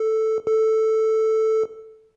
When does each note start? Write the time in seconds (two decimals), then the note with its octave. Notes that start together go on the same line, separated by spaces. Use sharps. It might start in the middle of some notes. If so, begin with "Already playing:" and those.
Already playing: A4
0.47 A4